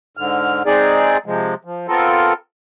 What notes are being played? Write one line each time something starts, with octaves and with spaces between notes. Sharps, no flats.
G#2 D3 F6
G#3 C4 D#4 G#4 D5
C3 F3 G#3
F3
B3 C4 F4 A4 A#4